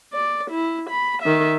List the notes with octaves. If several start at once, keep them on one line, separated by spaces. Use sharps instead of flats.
D5
E4
B5
D#3 E5